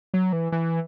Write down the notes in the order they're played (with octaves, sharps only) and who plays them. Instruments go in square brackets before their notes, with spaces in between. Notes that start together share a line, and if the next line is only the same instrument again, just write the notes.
[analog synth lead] F#3
E3
E3